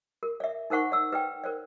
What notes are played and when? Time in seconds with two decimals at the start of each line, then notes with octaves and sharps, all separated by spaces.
0.23 A#4
0.40 D5 E5
0.70 D#4 A#4 C5 F#5 C#6
0.92 D5 E6
1.12 B4 D5 G5
1.44 A#4 C5 D5